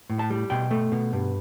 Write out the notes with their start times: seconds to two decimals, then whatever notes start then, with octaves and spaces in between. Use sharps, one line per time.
0.10 A2
0.19 A5
0.30 G3
0.50 B2 G5
0.71 A3
0.92 B2
1.13 G2